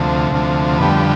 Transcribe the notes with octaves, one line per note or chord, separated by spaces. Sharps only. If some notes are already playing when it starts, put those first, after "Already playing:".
Already playing: D2 C3 F3 A3
D2 C3 F3 A3
F2 D3 G3 B3